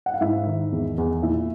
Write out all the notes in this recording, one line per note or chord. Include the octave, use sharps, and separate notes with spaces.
F#5
F5
G#2 E4 E5
D#3
E2
E2
A#2 E4 E5